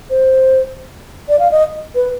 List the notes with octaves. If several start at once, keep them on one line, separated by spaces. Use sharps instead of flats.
C5
D5
F5
D#5
B4